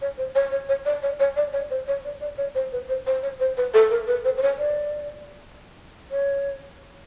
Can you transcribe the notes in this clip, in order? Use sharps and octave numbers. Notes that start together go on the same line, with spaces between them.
C#5
C5
C#5
C#5
C#5
D5
C#5
C#5
D5
C#5
C5
C#5
D5
D5
C#5
C5
B4
C5
C5
C#5
C5
B4
A4
A#4
B4
C5
C5
C#5
D5
C#5